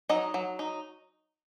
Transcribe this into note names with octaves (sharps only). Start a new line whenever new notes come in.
F#3 D#4 D#5
F#3
D#4